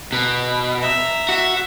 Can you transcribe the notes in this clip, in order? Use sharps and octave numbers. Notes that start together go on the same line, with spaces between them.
B2
E5 A#5
F#4 E5